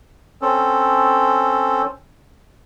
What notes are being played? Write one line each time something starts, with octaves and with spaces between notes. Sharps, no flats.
C4 C#4 A4